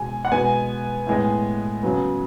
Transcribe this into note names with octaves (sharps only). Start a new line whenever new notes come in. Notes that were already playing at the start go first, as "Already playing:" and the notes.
Already playing: B2 G#3 G#5
F#5
B2 G#3 B3 G#5
A2 G#3 B3
C#3 F#3 B3